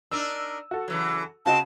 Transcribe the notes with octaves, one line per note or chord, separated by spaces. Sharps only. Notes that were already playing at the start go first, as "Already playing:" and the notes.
D4 D#4 A#4 E6
F#4 A4
C#3 E3 F#3
C#3 C4 F#4 D#5 A5